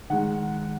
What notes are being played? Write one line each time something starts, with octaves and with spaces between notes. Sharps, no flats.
D#3 G#3 F#5